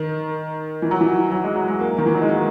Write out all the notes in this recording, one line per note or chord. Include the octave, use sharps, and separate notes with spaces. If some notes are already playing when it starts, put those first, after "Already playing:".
Already playing: D#3
E3
F#3
E3
F#3
G#3
F#3
G#3
A#3
D#3
E3
F#3
G#3
A#3